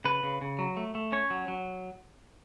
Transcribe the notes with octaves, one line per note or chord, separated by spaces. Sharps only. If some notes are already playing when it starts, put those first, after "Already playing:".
C#3 B4
C#3
C#3
F#3
A3
A3
C#4 C#5
F#3
F#3